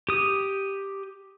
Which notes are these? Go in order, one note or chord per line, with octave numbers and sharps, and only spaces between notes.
G4 D#6